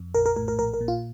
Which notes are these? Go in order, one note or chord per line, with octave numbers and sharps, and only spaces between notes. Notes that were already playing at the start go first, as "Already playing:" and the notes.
Already playing: F2
A#1 A#4
A#4
A2 A#4
A#4
A#1 A#4
A#4
A#2
F4